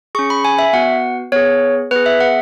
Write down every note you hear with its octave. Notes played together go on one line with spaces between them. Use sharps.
C#4 G#4 C#6
B5
G#5
E5
B3 F#4 F#5
B3 G#4 C#5
B3 G#4 B4
E5
F#5